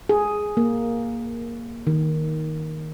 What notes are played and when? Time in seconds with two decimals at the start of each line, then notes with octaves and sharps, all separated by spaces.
0.09 G#4
0.57 A#3
1.87 D#3